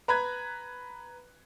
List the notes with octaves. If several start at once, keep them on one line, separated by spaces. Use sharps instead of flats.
B4 A#5 B5 F#6 G#6